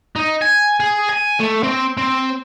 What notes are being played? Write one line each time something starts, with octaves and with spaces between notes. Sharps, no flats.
D#4
G#5
G#4
G#5
A3
C4
C4